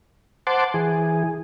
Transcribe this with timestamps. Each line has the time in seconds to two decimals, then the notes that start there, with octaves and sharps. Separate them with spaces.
0.47 C5 F#5 A5 C6 D6
0.74 E3 G#4